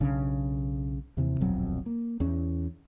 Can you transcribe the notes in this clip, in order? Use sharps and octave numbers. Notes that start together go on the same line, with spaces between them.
B1 C#3 D4
D#2 C3 E3
D#1 B1 F2 F#3
A#3
E2 C#4